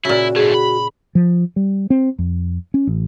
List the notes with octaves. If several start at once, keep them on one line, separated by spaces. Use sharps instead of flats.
A#2 C#3 E4 F#4
G#2 A3 G#4
B5
F3
G3
C4
F2
C#4
A1